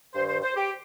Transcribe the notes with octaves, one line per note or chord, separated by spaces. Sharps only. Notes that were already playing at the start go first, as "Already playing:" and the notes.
G2 D#3 C5
C5
C5
G4